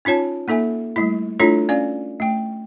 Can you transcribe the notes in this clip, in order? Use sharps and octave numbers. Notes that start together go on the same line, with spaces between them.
C#4 D#4 F4 C#5 A5
A#3 D#4 A4 E5 G#5
G3 A3 E4
A3 D4 E4 F4 A4 C#5
C#4 D5 F5 G#5
A3 G5